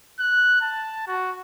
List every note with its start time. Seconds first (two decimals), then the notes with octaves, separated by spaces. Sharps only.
0.20 F#6
0.61 A5
1.07 F#4